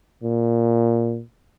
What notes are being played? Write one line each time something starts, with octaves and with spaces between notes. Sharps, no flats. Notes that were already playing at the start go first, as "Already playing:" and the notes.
A#2